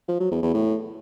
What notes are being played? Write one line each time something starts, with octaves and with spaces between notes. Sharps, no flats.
F3
F#3
E2
E2
A2